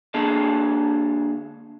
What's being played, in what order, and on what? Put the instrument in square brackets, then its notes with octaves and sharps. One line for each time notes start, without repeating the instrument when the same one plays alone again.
[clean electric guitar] D3 A#3 D4 G#4 A5